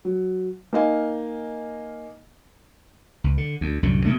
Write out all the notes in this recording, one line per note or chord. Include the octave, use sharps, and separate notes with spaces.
F#3
A#3 D#4 D#5 F5 G#5
C#2
D3
D2
C2 F#2 A2 D3
B2 D3 G#3 A3